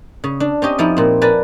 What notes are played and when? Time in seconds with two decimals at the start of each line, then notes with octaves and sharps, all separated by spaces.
0.24 C#3
0.40 D4
0.62 C4 C#4 G4 D#5
0.78 F2 F3 D#4 E4
0.97 A#2 C4
1.22 A#4 B4 D5 G#5 A5